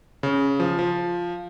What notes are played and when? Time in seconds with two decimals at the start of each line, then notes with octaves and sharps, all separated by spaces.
0.23 C#3
0.60 F3
0.79 F3